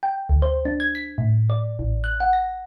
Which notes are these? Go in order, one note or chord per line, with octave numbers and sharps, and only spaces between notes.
G5
D2
C5
D4
G#6
B6
A2
D5
A1
F#6
F#5
A#6